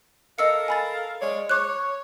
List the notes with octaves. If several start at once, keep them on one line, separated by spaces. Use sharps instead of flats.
A4 A#4 D#5 F5 E6 C#7
G#5 B5 A6
G#3 C#5 D5
C#5 D6 F#6